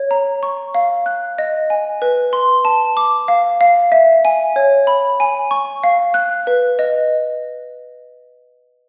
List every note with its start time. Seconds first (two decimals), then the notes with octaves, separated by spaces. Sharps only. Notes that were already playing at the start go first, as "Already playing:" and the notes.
Already playing: C#5
0.11 A#5
0.43 C#6
0.75 F5
1.06 F#6
1.38 D#5
1.70 G#5
2.02 B4
2.33 C6
2.65 A5
2.97 D6
3.28 F5
3.61 F5
3.92 E5
4.25 G#5
4.56 C#5
4.87 B5
5.20 G#5
5.51 C#6
5.84 F5
6.14 F#6
6.47 B4
6.79 D#5